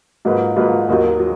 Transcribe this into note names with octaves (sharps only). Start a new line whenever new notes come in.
G#2 F#3 A#3 F4 B4
G#2 F#3 A#3 F4 B4
D#2 D#3 F#3
F#3